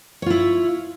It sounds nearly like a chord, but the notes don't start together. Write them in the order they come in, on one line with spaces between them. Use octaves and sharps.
C#5 F4 E4